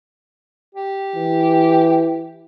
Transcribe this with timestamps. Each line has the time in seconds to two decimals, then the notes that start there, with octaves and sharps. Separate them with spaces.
0.75 G4
1.16 E3